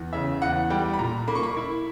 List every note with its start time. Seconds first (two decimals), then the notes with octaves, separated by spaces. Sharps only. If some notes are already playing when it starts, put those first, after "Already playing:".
Already playing: E2
0.13 C#3 E5
0.42 E2 F#5
0.70 G3 G5
0.93 B5
0.99 A#2 A#5
1.28 A#3 B5
1.35 C#6
1.43 B5
1.57 E4